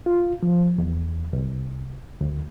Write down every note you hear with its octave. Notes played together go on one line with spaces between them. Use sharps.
F4
F3
E2
C2
D2